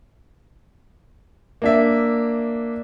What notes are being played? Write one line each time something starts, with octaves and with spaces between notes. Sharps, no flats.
A#3 D4 E5